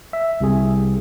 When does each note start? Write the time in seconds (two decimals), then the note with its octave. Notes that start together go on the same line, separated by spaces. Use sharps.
0.13 E5
0.40 C2 C3 G#4